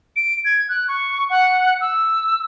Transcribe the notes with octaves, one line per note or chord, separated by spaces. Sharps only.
D7
G#6
F#6
C#6
F#5
E6